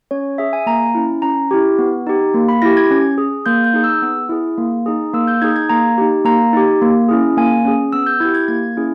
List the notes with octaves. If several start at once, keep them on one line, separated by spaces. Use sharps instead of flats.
C#4 C#5
G#4 E5
G#5
A#3 A#5
C#4 E4
C#4 A#5
E4 G4
B3
D#4 G4
A#3
B5
E4 G4 A#6
G#6
C#4
G#4
A#3 G6
G6
D#4 G#4
E6
B3
E4 G#4
A#3
D#4 G#4
A#3 E6
G6
D#4 G#4 G#6
G#6
A#3 A#5
D#4 G4
A#3 A#5
D#4 G4
A#3
C#4 E4 G#4
A#3 G#5
C#4 G#4
B3 E6
G6
E4 G4 G#6
G#6
A#3 G#6
C#4 E4 G#4